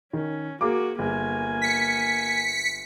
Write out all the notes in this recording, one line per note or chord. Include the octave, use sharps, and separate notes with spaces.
D#3 C#4
A#3 F#4 G#4 D6
G1 A#3 G#4 G#5
B6 C#7